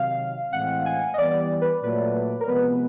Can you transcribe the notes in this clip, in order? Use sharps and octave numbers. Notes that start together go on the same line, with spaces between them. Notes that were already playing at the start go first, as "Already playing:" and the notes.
Already playing: C3 D#3 F#3 F5
A2 E3 G#3 C4 F#5
G#5
D#5
E3 G3 B3 D5
B4
A#2 F#3 A3 B4
A#4
C3 F3 G#3 B3 B4